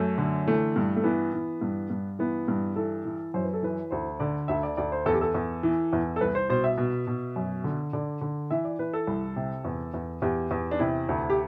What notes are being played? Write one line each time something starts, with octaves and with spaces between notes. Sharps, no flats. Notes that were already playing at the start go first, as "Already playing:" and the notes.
Already playing: F#2 A3
D3
E3 A3
G2
A3
E3 B3
E3
G2
G2
E3 B3
G2
E3 A4
E3
F#2 C5
B4
A4
E3 B4
D2 C5
D3 D5
D2 E5
D5
D2 D5
C5
E2 A4
G4
A4
E2
E3
E2
A4
C2 B4
C5
B2 C5
E5
B2
B2
F#2
D3
D3 D5
D3
E3 E5
D5
E3 B4
A4
C2
C3
E2
E2
E2 G4
E2
D4
C3 E4
D2
G4